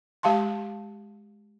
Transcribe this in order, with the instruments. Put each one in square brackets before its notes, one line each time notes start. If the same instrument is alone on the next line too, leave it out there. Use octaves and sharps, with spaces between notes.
[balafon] G#3 G4 F5 A5 C6